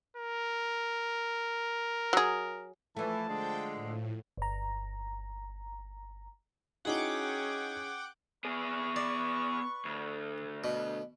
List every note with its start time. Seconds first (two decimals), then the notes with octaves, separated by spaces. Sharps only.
0.16 A#4
2.13 F#3 G#4
2.97 E3 F3 A3 A5
3.28 D3 G#3 G5
3.73 A2
4.37 G1 A#5
6.85 C#4 D#4 E4 F#4 G#4 F#5 G5 D6
8.45 B3 G#4 B4 C#6
8.96 D5
9.85 D2
10.64 B2